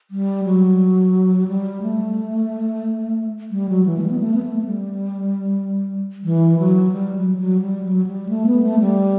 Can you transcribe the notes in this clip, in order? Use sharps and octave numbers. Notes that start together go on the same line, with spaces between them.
G3
F#3
G3
A3
G3
F#3
E3
A3
G3
B3
A3
B3
A3
A3
G3
E3
F#3
G3
F#3
F#3
G3
F#3
G3
A3
B3
A3
G3